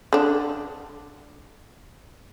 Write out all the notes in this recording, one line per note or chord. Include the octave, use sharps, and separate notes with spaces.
D3 D4